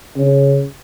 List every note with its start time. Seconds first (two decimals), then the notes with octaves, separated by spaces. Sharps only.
0.17 C#3